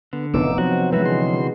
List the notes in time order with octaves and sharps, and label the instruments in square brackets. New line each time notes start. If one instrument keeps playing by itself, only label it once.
[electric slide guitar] D3 [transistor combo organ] B3
[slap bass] F1 F#2 A2 [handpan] B3 D#4 [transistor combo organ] D6 E6
[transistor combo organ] C3 C4 [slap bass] F3 F#3 [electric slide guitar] F#4
[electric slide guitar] C3 E3 F#4 [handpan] G#3 B4 [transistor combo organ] E5
[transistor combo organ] D3 C6